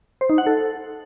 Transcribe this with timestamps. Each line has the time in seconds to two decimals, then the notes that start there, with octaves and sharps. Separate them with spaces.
0.21 C5
0.30 D#4
0.38 F#5
0.46 A4